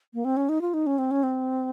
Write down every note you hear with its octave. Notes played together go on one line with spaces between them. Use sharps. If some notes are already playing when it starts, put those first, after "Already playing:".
A#3
C4
C#4
D#4
F4
D#4
C#4
C4
C#4
C4